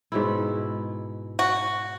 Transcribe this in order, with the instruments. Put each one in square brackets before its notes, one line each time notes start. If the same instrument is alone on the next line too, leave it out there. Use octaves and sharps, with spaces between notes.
[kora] G#2 B2 E4
[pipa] F#4